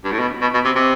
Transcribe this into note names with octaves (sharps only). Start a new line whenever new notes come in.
G2
A2
B2
B2
B2
C3
C3